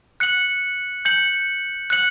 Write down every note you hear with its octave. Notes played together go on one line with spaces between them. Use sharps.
F#6 C#7 F#7
G6 C#7 F#7
F#6 C#7 F#7